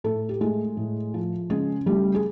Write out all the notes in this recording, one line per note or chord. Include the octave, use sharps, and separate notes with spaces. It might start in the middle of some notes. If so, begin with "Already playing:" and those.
A2 A3 A4
G4
G#3 A3 G#4
A2
F3
C#3 G#3 G#4
G3 A3 G4
G#4